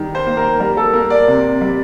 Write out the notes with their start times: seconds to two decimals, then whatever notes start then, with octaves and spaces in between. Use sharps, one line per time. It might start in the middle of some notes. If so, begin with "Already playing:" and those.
Already playing: D#3 G3
0.15 C5
0.27 A#3
0.37 A#4
0.60 G3 A#4
0.77 A4
0.93 A#3 A#4
1.10 D5
1.28 C3
1.61 G3